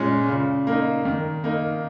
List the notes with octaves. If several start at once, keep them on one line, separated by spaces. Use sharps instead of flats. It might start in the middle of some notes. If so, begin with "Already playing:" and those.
Already playing: A#2 G#3 C#4
C#3
A#3 D#4
D#3
A#3 D#4